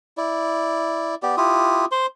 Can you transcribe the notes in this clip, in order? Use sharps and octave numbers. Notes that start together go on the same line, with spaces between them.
E4 D5
B3 G4 D5
E4 F4 G4 D#6
C5 C6